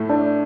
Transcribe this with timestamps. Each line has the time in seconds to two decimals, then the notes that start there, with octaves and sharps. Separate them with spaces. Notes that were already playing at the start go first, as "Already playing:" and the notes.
Already playing: A2 A3 E4
0.09 D4 D5